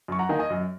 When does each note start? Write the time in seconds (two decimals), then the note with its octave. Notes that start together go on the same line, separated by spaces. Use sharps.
0.08 F#2 C#6
0.19 F#5 A#5
0.29 D#3 A#3 D#5 G#5
0.39 D#5 G#5
0.50 F#2